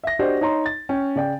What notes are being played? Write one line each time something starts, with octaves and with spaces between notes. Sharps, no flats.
E5 A#6
D4 F#4 G4 C5 D5 D#5
D#4 C#5 A#5 C6
A6
C#4 G5
C#3 D5 G5